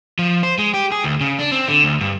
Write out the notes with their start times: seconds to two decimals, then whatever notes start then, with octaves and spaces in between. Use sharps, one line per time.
0.19 F3
0.43 C5
0.59 G#3
0.74 G4
0.92 G#4
1.04 D2
1.21 C#3
1.39 D4
1.52 C4
1.68 D3
1.84 D2
2.01 G2